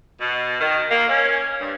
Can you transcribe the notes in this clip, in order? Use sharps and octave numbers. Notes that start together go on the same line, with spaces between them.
B2
D#3
A#3
C#4
G2